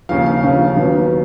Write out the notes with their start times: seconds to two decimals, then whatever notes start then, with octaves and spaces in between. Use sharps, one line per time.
0.09 D#2 C#3 F3 F5
0.26 F5
0.43 D#2 C#3 F3
0.76 D#2 D#3 F#3 B3